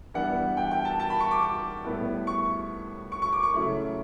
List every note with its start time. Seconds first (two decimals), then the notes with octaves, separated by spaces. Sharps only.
0.14 G2 E3 G3 B3 E4 F#5
0.57 G5
0.71 G5
0.85 A5
1.00 A5
1.10 B5
1.20 C#6
1.31 D6
1.43 D6
1.84 A2 G3 B3 E4
2.27 C#6
3.12 C#6
3.22 C#6
3.32 D6
3.43 C#6
3.54 C#3 F#3 A3 E4